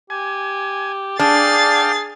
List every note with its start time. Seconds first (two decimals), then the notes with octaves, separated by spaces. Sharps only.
0.10 G4 G#5
1.19 D4 G#4 F5 G5 D6 A6 C7